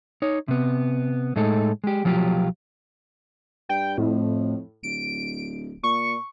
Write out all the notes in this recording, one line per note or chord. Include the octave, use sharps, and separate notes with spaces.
D#4 C#5
C3 B3
A2 G#3 D#4 A4
G#3 G4
B1 F3 F#3 F4 G4
G2 G5
F2 A2
D1 D7
A#2 C#6